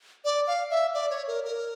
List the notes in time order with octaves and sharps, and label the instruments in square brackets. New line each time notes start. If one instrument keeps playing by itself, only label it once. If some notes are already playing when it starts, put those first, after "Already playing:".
[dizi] D5
F5
E5
D5
C#5
A#4
A#4